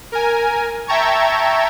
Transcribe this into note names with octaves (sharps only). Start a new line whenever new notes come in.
A#4 G#5
E5 G5 A5 A#5 C#6 G#6